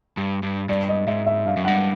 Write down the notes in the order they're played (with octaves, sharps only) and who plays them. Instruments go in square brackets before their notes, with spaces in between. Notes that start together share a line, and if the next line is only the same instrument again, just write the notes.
[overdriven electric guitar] G2
G2
[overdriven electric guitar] G2 [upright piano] D5
[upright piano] D#5
[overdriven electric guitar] G#2 [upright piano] E5
[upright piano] E5
[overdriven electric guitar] G2 [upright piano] F5
[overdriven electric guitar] F#2
[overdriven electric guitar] G2 [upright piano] F#5